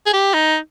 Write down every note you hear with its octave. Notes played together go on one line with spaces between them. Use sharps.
G#4
G4
D#4